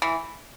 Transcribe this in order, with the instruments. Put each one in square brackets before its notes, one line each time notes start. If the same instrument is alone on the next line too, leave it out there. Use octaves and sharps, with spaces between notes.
[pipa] E3